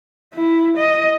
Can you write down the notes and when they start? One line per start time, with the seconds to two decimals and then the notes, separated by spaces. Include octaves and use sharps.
0.34 E4
0.77 D#5